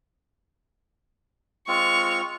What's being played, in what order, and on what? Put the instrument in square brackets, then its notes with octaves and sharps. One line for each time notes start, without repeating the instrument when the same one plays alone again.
[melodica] G#3 C4 F4 [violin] C#6 F7